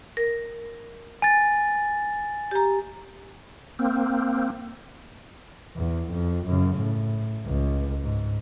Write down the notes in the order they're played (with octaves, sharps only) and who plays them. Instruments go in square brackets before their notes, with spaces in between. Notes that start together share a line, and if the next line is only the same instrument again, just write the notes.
[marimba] A#4
[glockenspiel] G#5 A6
[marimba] G4 A#5
[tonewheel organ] A#3 C4
[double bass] E2
F2
F#2 C#3
A2
C#2
G#2